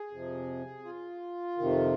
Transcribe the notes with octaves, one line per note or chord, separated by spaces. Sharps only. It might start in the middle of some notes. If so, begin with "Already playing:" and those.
Already playing: G#4
F2 C3 F3
F4
F2 C3 D#3